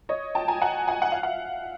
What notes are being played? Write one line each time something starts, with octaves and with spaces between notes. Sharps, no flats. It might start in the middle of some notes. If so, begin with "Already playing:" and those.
C#5 D#5
G5 A5
G#5 A#5
F#5 G#5
F#5 G#5
F#5
F5
E5 F#5